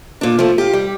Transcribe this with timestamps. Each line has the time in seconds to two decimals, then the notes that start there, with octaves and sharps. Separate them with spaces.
0.21 A#2 D4
0.39 F3 A3
0.58 F4 G4
0.73 G3